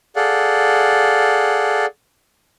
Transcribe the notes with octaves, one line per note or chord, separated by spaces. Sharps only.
G#4 A4 D5 F5 F#5